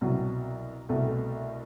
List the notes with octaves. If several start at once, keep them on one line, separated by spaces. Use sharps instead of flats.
C2 B2 F#3
C2 B2 A3